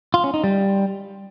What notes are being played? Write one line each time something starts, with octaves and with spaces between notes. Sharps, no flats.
F4
C#4
D#4
G3